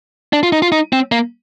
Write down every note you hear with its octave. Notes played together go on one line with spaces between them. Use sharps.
D4
F4
D#4
F4
D#4
C4
A#3